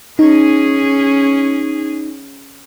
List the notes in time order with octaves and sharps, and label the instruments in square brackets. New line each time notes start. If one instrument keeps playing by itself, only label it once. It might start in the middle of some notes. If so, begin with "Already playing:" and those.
[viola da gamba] C#4 G#4 [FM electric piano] D#4